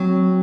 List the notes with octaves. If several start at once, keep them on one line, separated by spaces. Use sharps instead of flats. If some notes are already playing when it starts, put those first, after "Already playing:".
Already playing: F#3 C4